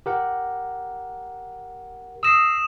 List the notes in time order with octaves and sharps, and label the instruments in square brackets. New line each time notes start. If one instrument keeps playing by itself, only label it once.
[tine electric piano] G4 A#4 F#5
[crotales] D#6 E7 [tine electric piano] E6 A#6 C7